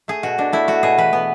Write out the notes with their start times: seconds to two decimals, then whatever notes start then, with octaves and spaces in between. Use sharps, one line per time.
0.08 A3 G#4
0.23 B2 F#4
0.38 B2 D4
0.53 A3 E4
0.68 A3 F#4
0.83 B2 G#4
0.98 E3 B4
1.13 B3